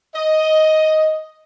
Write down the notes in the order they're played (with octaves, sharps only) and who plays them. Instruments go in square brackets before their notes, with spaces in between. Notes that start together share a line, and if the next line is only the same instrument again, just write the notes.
[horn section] D#5